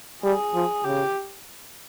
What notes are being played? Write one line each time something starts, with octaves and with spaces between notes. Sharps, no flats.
G3 G#4
F3
C#3 G4